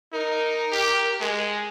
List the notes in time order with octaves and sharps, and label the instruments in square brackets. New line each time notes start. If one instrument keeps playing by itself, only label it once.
[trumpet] D#4 [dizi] A#4
[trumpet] G4
G#3